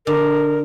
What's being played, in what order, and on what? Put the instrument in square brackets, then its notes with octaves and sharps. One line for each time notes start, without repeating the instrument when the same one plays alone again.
[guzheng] D3 [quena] A#4